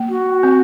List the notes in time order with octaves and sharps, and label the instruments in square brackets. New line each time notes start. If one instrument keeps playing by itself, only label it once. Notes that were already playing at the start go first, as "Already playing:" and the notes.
Already playing: [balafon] A#3
[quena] F#4
[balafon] C4